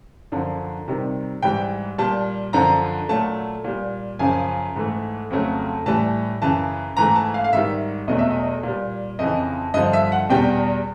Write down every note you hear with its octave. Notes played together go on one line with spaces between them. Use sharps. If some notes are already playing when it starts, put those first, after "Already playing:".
F#2 D3 F3
C3 D#3 G3
G#2 E3 G3 G5
A#2 G3 A5
F#2 D3 F3 A#5
A#2 F#3 A3 A5
A#2 G3
F#2 C#3 F3 G#5
G#2 E3 A3
F2 C#3 F#3 A3
A2 E3 G3 A5
F#2 C#3 E3 A5
G#2 E3 A3 A#5
A5
F5
F5
G#2 D#3 G3 E5
E2 B2 F#3 A3 D#5
E5
D#5
A#2 G3
F2 C#3 E3 D#5
G2 D3 F3 D#5
E5
F#5
E2 B2 G3 G5